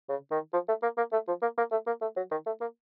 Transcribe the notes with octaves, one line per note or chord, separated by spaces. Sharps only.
C#3
D#3
F3
A3
A#3
A#3
A3
F3
A#3
A#3
A3
A#3
A3
F#3
D#3
A3
A#3